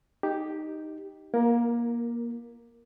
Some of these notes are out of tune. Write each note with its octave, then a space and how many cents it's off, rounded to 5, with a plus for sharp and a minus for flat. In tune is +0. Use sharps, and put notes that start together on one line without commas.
D#4 +0 G4 +0
A#3 +20 E4 +40 A#4 +0